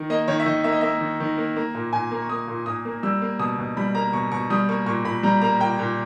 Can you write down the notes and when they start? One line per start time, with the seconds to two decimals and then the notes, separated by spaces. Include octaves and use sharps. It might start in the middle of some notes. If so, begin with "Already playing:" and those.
Already playing: D#3
0.10 A#3 D#5
0.28 D#3 C#5
0.40 E5
0.46 D#3 D#5
0.64 A#3 E5
0.72 D#5
0.81 A#3 E5
1.01 D#3
1.20 D#3
1.37 A#3
1.56 A#3 A#5
1.75 A#2
1.93 A#2 G#5
2.12 A#3
2.22 C#6
2.29 A#3 D#6
2.48 A#2
2.66 A#2 D#6
2.85 A#3
3.03 G3 E6
3.22 A#3
3.39 B2 D#6
3.59 B2
3.77 G3 B5
3.95 A#3 A#5
4.13 B2 C#6
4.32 B2 C#6
4.50 G3 D#6
4.69 A#3 C#6
4.86 A#2 C#6
5.05 A#2 B5
5.23 G3 A#5
5.41 A#3 A#5
5.60 A#2 G5
5.79 A#2